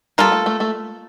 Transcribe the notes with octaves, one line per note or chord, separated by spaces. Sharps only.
G3 A#3 F4 A4
A3
A3
A3